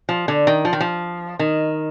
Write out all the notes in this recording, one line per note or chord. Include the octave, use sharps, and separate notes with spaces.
F3
D3
D#3
F3
D#3
F3
D#3